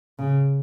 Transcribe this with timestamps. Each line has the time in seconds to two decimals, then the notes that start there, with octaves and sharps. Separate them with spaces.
0.19 C#3